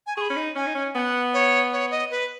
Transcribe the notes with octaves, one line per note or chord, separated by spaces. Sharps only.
G#5
G#4 B5 C#6
C#4
D#4
C#4 G#5
D#4
C#4
B3 F#5 G#5
C#5
C#5
D#5
B4